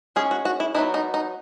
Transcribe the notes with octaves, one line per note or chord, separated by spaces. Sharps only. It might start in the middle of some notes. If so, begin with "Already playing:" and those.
G#3 C#4 G#4
F#4
F#4
E4
F#3 B3 D#4 E4
D#4
D#4